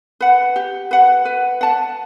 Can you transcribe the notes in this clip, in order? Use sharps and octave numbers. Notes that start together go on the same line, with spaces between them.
B4 F#5
G4
B4 F#5
B4
F#5 A5